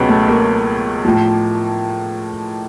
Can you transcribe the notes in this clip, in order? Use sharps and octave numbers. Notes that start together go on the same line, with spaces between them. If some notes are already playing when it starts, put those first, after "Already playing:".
Already playing: C#2 B2 F#3 B3 C#4
A3
A#3
A2 F3